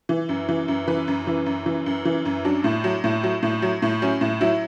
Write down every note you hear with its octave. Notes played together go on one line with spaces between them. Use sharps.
E3
F#2
E3
F#2
E3 B4
F#2
E3
F#2
E3
F#2
E3
F#2
F#3 D4
A2
F#3
A2
F#3
A2
F#3
A2
F#3 C#4
A2
F#3 E4